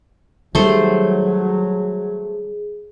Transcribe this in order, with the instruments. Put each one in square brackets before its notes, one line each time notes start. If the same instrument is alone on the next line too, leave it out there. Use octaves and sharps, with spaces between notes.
[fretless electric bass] D#3 G3 [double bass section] F#3 [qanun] A3 C5 [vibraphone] G#4